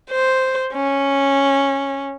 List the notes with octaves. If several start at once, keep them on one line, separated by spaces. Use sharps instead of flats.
C5
C#4